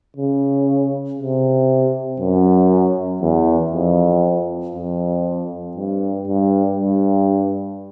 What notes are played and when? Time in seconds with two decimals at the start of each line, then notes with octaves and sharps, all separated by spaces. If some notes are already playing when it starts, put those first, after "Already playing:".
0.17 C#3
1.19 C3
2.20 F#2
3.22 E2
3.73 F2
4.75 F2
5.76 G2
6.28 G2
6.77 G2